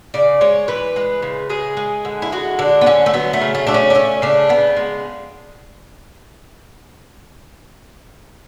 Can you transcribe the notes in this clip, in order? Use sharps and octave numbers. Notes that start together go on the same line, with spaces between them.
C#3 D5
G#3 C#5
E3 B4
G#3
C#3
G#3 G#4
G#3
D3
E4
G#3 F#4
D3 D4
B3
D3 C#4
A3
F#3 B3
A3
C#3
A3
A3 D4
C#4
D4
A3 C#4
C#3 D4
C#3 B3
G#3